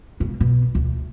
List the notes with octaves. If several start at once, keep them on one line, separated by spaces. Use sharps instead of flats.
E1 C#3
B2
D2